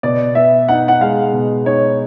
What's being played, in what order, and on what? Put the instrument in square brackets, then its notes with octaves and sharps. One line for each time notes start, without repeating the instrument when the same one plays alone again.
[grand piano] B2 [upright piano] D5
[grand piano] B3 [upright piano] E5
[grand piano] D#4 [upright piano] F#5
[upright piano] F#5
[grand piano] G#3 [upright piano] F5
[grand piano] B2
[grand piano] D#4 [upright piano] C#5